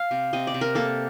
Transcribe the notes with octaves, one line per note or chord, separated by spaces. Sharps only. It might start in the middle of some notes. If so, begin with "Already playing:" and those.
Already playing: F5
C3
C3 D#5
D5
C3
A#4
A#3 A4